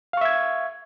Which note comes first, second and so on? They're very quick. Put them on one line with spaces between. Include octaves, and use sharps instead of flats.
F5 C#6 E5 G#6